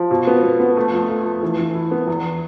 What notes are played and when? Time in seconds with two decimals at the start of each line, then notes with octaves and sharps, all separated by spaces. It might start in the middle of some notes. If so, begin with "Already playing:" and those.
Already playing: F3
0.11 B2
0.27 B3
0.43 B3
0.60 B3
0.77 A3
0.92 F2
1.09 A3
1.26 A3
1.43 E3
1.59 E3
1.75 E4
1.91 B3
2.07 E2